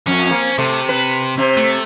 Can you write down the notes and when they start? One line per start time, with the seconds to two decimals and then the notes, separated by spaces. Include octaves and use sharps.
0.07 F2 C#4
0.31 A#3 C4
0.58 C3 A3
0.89 B4
1.37 C3 C4
1.57 A3